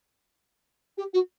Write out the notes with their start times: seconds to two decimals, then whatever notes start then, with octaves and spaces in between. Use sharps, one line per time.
0.98 G4
1.14 F#4